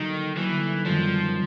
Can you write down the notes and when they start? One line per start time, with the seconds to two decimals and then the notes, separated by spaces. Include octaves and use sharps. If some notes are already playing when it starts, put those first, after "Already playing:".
Already playing: D3 D#3 F#3 A#3 D#4 F#4
0.37 D3 E3 F#3 A#3 D#4 F#4
0.85 F#2 D#3 F3 G3 B3 D#4